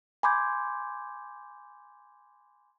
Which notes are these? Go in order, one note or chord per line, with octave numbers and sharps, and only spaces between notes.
G#5 B5 C6 D6 G6 G#6